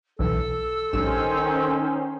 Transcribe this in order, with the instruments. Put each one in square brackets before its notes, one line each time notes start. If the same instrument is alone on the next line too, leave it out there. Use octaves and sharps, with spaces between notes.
[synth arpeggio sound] B1 E3 [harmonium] A4 [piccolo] E6
[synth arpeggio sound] A#1 G2 E7 [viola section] D#3 C#4 C5